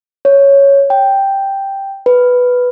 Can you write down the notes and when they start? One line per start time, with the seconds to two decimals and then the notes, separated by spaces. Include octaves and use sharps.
0.25 C#5
0.90 G5
2.06 B4